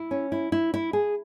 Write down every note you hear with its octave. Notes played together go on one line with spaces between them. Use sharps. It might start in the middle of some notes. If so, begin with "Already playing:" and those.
Already playing: E4
C#4
E4
E4
E4
G#4